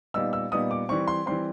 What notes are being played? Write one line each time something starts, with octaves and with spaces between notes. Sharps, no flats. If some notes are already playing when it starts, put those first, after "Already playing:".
A#2 G3 B3 D#4 E6
E6
A#2 G3 B3 D#4 D#6
D6
E3 G3 C4 C#6
C6
E3 G3 C4 C6